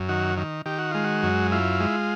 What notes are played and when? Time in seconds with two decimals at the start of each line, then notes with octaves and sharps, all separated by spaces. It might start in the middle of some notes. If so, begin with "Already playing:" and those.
Already playing: F#2
0.09 D#3 F#4
0.37 D#3
0.66 D#3 G4
0.79 F#4
0.91 G#3 F4
1.04 F#4
1.23 F#2
1.51 E4 F4
1.80 G#3